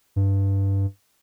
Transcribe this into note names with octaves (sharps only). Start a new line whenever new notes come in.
G2